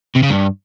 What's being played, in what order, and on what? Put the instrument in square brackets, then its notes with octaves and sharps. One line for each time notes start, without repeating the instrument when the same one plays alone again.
[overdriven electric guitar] C3
C#3
G2